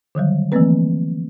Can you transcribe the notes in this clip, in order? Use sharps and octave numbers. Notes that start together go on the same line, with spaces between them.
D3 D#3 F#3 G3
E3 F3 A3 A#3 C4 B4